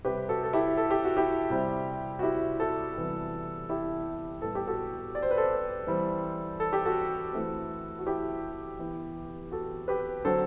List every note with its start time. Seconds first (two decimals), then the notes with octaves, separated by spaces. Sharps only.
0.05 C3 G3 C4 G4 B4
0.29 F#4 A4
0.43 A4
0.53 E4 G4
0.77 A4
0.90 G4
1.04 F#4
1.17 E4 G4
1.50 C3 G3 C4
2.19 F#4
2.23 E4 G4
2.60 F#4 A4
2.97 C3 E3 G3 B3
3.69 E4 G4
4.42 A2 G3 B3 A4
4.55 G4
4.67 F#4 A4
5.15 D5
5.22 C5
5.31 B4
5.37 A4 C5
5.87 E3 G3 C4
6.60 A4
6.73 G4
6.85 F#4 A4
7.33 E3 A3 C4
7.99 F#4
8.07 E4 G4
8.79 E3 B3
9.51 F#4 A4
9.88 G4 B4
10.25 D3 F#3 C4 A4 C5